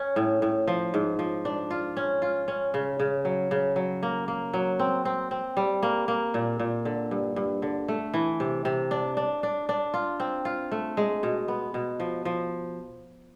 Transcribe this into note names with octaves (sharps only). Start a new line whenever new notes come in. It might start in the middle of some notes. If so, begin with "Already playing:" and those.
Already playing: C#4
A2
A2
F3
G#2
F3
D4
F4
C#4
F4
C#4
C#3
C#3
F#3
C#3
F#3
A#3
A#3
F#3
C4
C4
C4
G3
A#3
A#3
A#2
A#2
D3
G2
G2
D3
A3
E3
C3
C3
D4
D4
D4
D4
F4
C4
F4
A3
G#3
B2
B3
B2
F3
F3